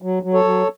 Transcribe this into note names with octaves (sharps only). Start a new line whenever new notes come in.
F#3
F#3
A4 C#5
F#3